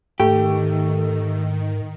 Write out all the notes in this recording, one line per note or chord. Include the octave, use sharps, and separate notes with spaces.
G#2 D#3 A3 G4